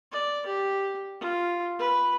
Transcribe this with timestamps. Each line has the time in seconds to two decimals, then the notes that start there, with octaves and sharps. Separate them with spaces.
0.12 D5
0.46 G4
1.21 F4
1.79 B4